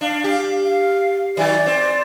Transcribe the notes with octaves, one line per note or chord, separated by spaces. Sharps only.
D4 F5
G4
F5
D#3 F#3 G4 D5
C4